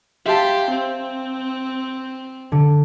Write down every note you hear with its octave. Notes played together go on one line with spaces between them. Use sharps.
G4 E5 F5 A5 C6
C4
D3